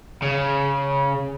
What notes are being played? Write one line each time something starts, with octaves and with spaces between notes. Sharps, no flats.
C#3